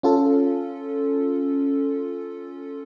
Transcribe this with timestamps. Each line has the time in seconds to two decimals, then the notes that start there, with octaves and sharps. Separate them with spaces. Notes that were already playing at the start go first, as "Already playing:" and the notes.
0.03 C#4 F4 A4